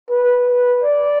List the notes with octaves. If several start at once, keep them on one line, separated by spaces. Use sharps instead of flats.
B4
B4
D5